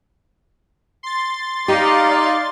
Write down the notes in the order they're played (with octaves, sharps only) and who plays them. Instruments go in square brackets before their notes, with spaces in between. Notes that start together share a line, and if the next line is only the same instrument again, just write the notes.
[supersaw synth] C6 A6
[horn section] D#4 [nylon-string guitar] G4 [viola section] D5 F5